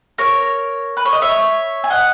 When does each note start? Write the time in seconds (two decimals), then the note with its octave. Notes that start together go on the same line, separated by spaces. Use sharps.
0.18 A#4 C#5
0.97 B4
1.05 C#5
1.13 D#5
1.22 C#5 E5
1.84 G#5
1.90 D#5 F#5